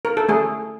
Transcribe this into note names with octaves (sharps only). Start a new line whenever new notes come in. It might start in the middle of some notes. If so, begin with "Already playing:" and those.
A#4
A4
A3 G#4